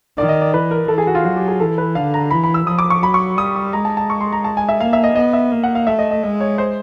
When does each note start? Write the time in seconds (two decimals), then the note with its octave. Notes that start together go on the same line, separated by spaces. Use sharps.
0.18 D#3 D5
0.29 D#5
0.41 D5
0.53 E3 B4
0.71 A#4
0.88 E3 A4
0.98 G#4
1.07 F#4
1.15 F4
1.24 F#3 F#4
1.36 G4
1.48 G#4
1.60 E3 A4
1.78 B4
1.95 D3 F5
2.14 A#5
2.31 E3 B5
2.44 B5
2.54 E6
2.67 F3 D#6
2.79 D6
2.90 C#6
3.02 F#3 B5
3.14 C#6
3.38 G3 D#6
3.55 D#6
3.73 G#3 A#5
3.85 A5
3.97 A5
4.10 C#6
4.21 C6
4.33 A#5
4.44 A5
4.57 G#5
4.69 E5
4.80 A#3 F5
4.93 E5
5.04 D#5
5.16 B3 D#5
5.33 E5
5.52 A#3
5.63 F#5
5.75 F5
5.87 A3 E5
5.99 D#5
6.11 D#5
6.23 G#3 D#5
6.40 C#5
6.58 C5